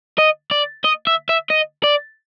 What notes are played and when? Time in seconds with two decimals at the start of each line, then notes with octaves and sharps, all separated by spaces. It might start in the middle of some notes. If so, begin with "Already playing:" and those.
0.18 D#5
0.51 D5
0.84 D#5
1.07 E5
1.29 E5
1.50 D#5
1.84 D5